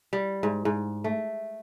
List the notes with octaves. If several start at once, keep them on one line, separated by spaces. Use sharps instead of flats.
G3
G#2
G#2
A3